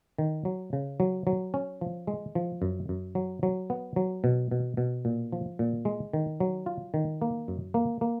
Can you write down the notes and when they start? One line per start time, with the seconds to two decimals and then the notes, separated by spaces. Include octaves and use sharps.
0.18 D#3
0.45 F#3
0.73 C#3
1.00 F#3
1.27 F#3
1.54 C#4
1.81 F3
2.07 G#3
2.35 F3
2.62 F#2
2.89 F#2
3.15 F#3
3.43 F#3
3.70 B3
3.96 F#3
4.24 B2
4.51 B2
4.77 B2
5.05 A#2
5.32 F3
5.59 A#2
5.85 G#3
6.13 D#3
6.40 F#3
6.66 F4
6.94 D#3
7.21 A#3
7.48 F#2
7.74 A#3
8.01 A#3